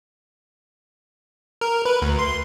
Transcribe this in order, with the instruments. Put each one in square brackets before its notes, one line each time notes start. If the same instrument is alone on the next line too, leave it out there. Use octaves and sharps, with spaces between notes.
[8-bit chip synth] A#4
B4
D2
C6